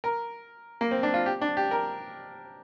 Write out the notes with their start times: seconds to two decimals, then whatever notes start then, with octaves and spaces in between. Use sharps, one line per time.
0.04 A#4
0.81 A#3
0.91 C4
1.03 D4
1.14 F4
1.26 G4
1.41 D4
1.57 G4
1.71 A#4